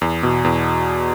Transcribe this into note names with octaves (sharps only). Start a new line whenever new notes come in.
E2
B2
E2